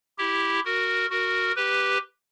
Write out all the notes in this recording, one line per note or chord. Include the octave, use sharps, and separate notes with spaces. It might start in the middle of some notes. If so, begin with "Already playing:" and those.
E4 G4
F#4 A#4
F#4 A#4
G4 B4